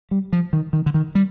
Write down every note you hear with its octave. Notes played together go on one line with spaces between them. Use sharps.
G3
F3
D#3
D#3
D3
D#3
G3